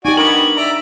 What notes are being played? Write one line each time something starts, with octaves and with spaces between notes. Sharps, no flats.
D#4 F#4 G4 D5 G#5
B3 D4 F#4 A#4 F#7
D5 E5 A#5